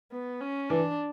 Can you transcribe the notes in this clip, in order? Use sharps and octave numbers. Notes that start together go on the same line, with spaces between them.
B3
C#4
E3 D4